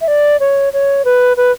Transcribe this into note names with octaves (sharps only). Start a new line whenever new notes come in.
E5
D5
C#5
C#5
B4
B4